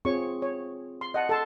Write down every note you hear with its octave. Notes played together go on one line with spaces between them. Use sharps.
C4 F4 G#4 C#5 C#6
C#5
C6
D#5 F#5 A5
A4 A5 C6